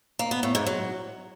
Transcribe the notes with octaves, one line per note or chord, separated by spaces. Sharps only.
A#3
B3
A2
G#2
F#3